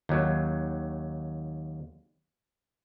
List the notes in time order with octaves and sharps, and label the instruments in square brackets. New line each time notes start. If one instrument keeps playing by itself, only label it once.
[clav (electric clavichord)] D#2 F#3